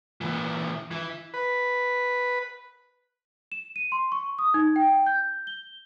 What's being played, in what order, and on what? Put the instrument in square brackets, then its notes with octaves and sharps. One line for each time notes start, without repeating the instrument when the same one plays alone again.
[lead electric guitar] A#2 E3
E3 E4
[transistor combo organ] B4
[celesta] E7
D#7
C6
C#6
D#6
D#4
G5
G6
G7